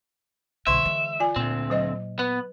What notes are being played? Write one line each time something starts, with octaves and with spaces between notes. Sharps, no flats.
B1 B2 D3 E5 C6
E3 G#3
F4 D5 G#5
D2 A#2 C4
F#3 C5 D#5
B3 B4